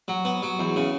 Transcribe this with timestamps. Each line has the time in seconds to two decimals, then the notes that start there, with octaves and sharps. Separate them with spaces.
0.08 F#3
0.25 B3
0.42 F#3
0.59 E2
0.76 C#3